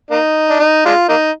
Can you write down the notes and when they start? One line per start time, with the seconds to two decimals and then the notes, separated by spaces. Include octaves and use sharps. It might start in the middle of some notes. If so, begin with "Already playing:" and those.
0.11 A#3 D#4
0.50 D4
0.60 D#4
0.85 G#3 D4 F4
1.09 A#3 D#4